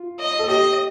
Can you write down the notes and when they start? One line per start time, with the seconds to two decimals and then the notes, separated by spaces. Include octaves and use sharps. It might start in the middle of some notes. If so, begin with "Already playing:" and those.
Already playing: F4
0.20 D#5
0.39 A4
0.48 G4 D#5